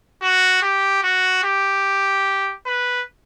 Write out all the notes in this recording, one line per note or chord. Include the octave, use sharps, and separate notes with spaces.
F#4
G4
F#4
G4
B4